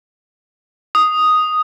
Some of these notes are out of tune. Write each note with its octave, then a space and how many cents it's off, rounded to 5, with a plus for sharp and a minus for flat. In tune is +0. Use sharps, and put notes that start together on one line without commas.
D#6 +0